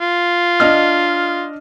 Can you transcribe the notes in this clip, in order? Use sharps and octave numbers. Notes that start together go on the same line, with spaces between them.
F4
D4 D#5 F6